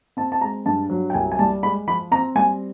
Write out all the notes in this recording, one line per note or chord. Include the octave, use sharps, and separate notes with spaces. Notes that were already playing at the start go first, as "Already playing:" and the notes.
C4 A5
A5
G#3 A#5
G2 A5
F#3
G5
C2 G#5
G#5
G3 A5
G#3 B5
F3 B5
C4 A#5
G3 G#5